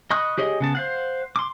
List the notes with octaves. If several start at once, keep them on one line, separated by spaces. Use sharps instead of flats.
D#5 B5 C#6 D#6 F#6
G4 G#4 C#5 D#5
C#3 B3 A5
C5 F5 F#5
C6 D6